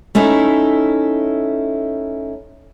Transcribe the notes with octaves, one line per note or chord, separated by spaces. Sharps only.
A3 C#4 D#4 E4